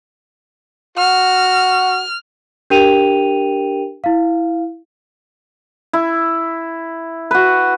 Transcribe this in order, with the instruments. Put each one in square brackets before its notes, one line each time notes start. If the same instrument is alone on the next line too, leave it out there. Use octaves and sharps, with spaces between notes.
[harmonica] F#4 [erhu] F6
[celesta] D4 G4 A#4 G5 D#7 F7
E4 F5
[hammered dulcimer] E4
F#4 B4